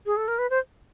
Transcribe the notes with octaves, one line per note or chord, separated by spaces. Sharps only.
G#4
A4
A#4
B4
C5